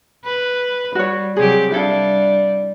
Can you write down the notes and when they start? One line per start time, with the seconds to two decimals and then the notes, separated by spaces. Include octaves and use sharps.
0.25 B4
0.95 G3 F#4 C#5
1.36 C3 F#3 G4 G#4
1.72 G3 D4 E4 A4 F5